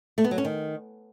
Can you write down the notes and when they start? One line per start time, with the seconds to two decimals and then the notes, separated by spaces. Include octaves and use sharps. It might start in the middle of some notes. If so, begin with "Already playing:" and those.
0.18 A3
0.24 B3
0.31 F#3
0.38 C#4
0.45 D#3